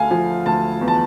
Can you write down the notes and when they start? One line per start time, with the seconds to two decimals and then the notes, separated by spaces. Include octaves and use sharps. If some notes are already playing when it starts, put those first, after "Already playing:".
Already playing: D2 A3 F5 G#5
0.11 F3 G#5
0.46 D2 A5
0.81 E2
0.88 A5